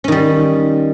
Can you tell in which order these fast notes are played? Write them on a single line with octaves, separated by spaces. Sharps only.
C#4 D#3 G3